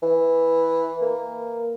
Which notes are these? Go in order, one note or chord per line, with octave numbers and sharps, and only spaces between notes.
E3
A#3